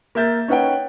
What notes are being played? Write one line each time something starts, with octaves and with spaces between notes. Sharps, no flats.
A#3 A#4 E5 G6 A6
C#4 D#4 B4 C#5 F#5 G5